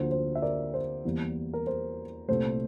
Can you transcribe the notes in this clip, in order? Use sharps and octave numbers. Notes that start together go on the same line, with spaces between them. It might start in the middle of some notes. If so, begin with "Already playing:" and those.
Already playing: D2 D3 F3 A#3 C5
C5
E5
A#4 D5
C5
E2 E3 G3 A#3
A#4
C5
C2 A#2 A3 C5